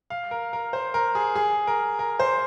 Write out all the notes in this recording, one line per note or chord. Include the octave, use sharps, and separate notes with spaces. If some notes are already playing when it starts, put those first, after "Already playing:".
F5
A#4
A#4
C5
A#4
G#4
G#4
A#4
A#4
C5